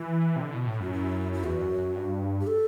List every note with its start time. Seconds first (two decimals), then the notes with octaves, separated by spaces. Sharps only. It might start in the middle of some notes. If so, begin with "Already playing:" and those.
Already playing: E3 E4
0.36 C3
0.41 D3
0.54 B2
0.66 A2
0.80 F#2 F#4
0.93 E4
1.33 E4
1.44 E2 F#4
1.61 F#2
1.78 F#2
1.96 G2
2.41 G4
2.47 A4